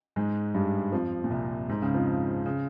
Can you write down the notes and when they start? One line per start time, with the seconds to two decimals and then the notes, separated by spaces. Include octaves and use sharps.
0.16 G#2 G#3
0.54 G2 G3
0.92 F2 F3
1.24 A#2
1.30 C2 C3
1.69 G#2
1.82 C#2 C#3
1.94 F2 F3
2.46 C#3